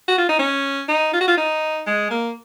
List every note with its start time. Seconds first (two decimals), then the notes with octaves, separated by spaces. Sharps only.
0.08 F#4
0.18 F4
0.29 D#4
0.39 C#4
0.88 D#4
1.13 F4
1.21 F#4
1.28 F4
1.38 D#4
1.87 G#3
2.11 A#3